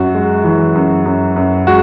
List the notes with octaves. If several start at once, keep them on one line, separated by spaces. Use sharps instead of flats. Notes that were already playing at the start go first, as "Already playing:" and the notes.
Already playing: F#2 F#4
G#3
E3
F#2
F#2
F#2
G#3 F#4